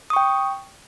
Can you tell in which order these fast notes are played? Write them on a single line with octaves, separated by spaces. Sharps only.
D#6 C#6 G5